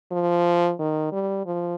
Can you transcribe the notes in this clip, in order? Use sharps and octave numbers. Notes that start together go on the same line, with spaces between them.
F3
D#3
G3
F3